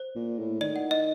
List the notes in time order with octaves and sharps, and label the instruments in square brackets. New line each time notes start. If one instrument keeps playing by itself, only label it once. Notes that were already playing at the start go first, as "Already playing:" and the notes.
Already playing: [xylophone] C5
[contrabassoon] A#2
A2
[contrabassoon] D#3 [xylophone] D5
[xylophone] F#5
D#5